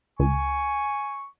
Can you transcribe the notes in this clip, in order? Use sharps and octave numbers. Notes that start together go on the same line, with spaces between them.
C#2 G#5 C#6